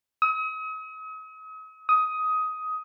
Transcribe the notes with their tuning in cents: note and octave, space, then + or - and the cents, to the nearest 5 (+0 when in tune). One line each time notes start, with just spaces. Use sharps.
D#6 +40
D#6 +15